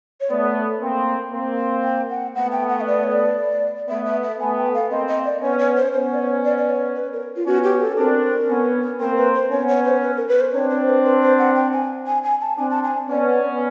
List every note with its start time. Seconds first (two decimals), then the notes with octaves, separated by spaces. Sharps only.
0.21 C#5
0.30 A3 B3 D5
0.82 A#3 C4
1.33 A#3 C4
1.84 G5
2.10 F#5
2.35 A3 B3 F#5
2.52 G5
2.69 F#5
2.81 D#5
2.87 D5
3.03 C#5
3.12 D5
3.89 A3 B3 E5
4.05 E5
4.23 E5
4.39 A3 B3 G#5
4.57 G5
4.74 F5
4.91 A#3 C4 D#5
5.08 D#5
5.25 D5
5.42 B3 C#4 C#5
5.59 C#5
5.76 C5
5.93 B3 C#4 C5
6.14 D5
6.19 C#5
6.44 D5
6.58 D5
6.70 C#5
6.96 B4
7.13 A#4
7.36 F4
7.47 B3 C#4 F#4
7.63 G4
7.80 A4
7.97 C4 D4 A#4
8.49 B3 C#4
9.00 A#3 C4 A#4
9.17 B4
9.34 C5
9.51 B3 C#4 C#5
9.68 C#5
9.85 C5
10.02 B4
10.17 A#4
10.28 B4
10.40 C5
10.54 C4 D4 C#5
10.70 C5
10.87 B4
11.04 B4
11.21 C5
11.39 F#5
11.55 G5
11.73 G#5
12.07 G#5
12.23 G#5
12.42 A5
12.58 C4 D4 G#5
12.70 A5
12.84 G#5
13.09 B3 C#4 D5